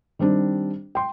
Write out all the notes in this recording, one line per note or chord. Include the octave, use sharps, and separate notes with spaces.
D#3 G3 C4 D4
G5 C6